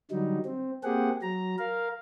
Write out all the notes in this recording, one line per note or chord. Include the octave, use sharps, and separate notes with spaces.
D3 F#3 G3 D#4
C4
A#3 C4 G4 G#4 F#5
F#3 A#5
A#4 F5